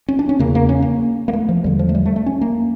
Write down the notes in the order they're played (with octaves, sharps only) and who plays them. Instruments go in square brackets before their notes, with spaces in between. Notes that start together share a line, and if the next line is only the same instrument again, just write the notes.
[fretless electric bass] C#4
D4
C#4
E2 C#3 A#3
A#3
C#4
A#3
A#3
A3
F3
E2 D3 G3
F3
A3
G3
A3
A3
C#4
A#3